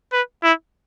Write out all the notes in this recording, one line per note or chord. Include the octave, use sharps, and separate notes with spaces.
B4
E4